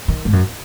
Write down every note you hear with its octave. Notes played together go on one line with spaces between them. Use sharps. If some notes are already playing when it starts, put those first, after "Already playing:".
D#3
G#2
F#2